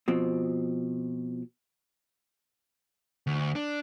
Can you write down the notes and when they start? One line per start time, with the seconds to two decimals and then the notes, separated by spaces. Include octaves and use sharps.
0.08 B2 F3 C4
3.27 D2
3.55 D4